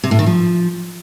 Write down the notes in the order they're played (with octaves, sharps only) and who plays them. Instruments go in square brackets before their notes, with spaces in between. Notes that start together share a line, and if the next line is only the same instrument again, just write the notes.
[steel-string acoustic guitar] C3
A2
D#3
F3